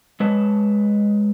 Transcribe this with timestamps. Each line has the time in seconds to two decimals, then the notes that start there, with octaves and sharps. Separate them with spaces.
0.20 G#3 B4 C#5 A5